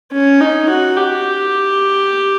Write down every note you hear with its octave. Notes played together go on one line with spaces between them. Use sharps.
C#4
D#4
F#4
G4